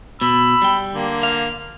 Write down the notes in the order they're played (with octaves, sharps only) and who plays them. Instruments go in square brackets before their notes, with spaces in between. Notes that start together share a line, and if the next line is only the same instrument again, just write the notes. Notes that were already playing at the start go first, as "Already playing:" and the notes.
[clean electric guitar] B2 [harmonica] B5 E6
[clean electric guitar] G3 G5
[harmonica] D3 A#3
[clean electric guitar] F5